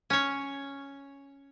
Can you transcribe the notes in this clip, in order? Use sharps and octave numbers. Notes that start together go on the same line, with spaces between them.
C#4 C#5